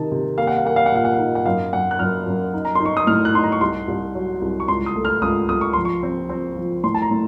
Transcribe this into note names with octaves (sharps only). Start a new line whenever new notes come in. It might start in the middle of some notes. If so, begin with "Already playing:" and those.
Already playing: C3 D#3 D#4 A5
C3
A#3 F5
F#5
F5
A#3 F#5
F5
F#5
A#2 F5
F#5
D#4 F5
F#5
F#2 F5
F#2 F#5
F#6
F#2 F6
F#2
D#4
A#5
D#4 C6
C#6
D#6
A2 F6
F#6
D#4 C6
A#5
C#6
C2 C6
C2
F#3
C2
C#6
C#2 C6
D#6
A3
F6
C#2 D#6
C#2 D#6
C#6
F3 C6
C#6
C4
C4
F3
A2 C6
A5
A#5
A2